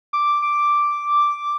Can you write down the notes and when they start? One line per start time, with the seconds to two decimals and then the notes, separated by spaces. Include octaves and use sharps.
0.13 D6
0.42 D6